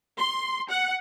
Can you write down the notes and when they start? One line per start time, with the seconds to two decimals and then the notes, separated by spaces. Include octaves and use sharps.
0.17 C6
0.69 F#5